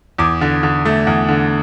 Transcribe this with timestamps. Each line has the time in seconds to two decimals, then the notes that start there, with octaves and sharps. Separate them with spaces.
0.18 E2 D6
0.41 D3
0.63 D3
0.85 A3
1.07 E2
1.29 D3